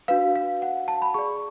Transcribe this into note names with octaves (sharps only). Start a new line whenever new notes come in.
D4 F#4 B4 F5
F5
F#5
A5
B5
G#4 D5 C#6